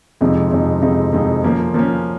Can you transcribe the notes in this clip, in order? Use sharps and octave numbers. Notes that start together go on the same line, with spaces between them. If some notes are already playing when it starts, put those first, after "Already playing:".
F2 C3 F3 G#3 D#4
F2 C3 F3 G#3 D#4
F2 C3 F3 G#3 D#4
F2 C3 F3 G#3 D#4
F3 A#3 C#4
F3 A#3 C#4